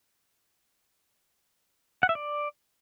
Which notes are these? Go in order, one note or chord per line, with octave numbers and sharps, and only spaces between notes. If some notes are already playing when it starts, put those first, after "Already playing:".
F#5
E5
D5